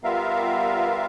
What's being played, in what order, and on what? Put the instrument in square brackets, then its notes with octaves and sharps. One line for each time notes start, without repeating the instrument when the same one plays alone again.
[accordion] G3 B3 F4 A#4 E5 F5